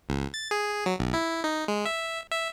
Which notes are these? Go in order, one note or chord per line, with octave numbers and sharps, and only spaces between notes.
C#2
A6
G#4
F#3
B1
E4
D#4
G#3
E5
E5